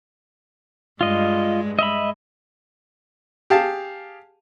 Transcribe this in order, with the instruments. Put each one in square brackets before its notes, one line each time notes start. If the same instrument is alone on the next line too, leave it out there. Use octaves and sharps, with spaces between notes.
[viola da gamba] G2 G#3 [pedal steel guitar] F4 D#5
[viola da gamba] G#3 [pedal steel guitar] D#5 E5 B5
[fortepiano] G4 G#4 F5 A5